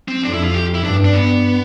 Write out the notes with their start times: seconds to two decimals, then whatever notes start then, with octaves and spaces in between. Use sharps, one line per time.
0.08 C4
0.23 F2 D4
0.33 E4
0.44 F4
0.54 G4
0.74 E4
0.84 G2 D4
1.04 D4
1.14 B3